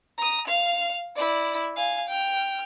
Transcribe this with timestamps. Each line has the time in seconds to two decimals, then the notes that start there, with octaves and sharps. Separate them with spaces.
0.18 A#5 D#6
0.47 F5 F7
1.16 E4 D5
1.76 F5 G#5
2.09 G5 F6